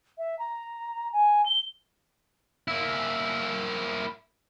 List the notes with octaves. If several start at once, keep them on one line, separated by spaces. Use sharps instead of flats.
E5
A#5
G#5
G7
A#3 E4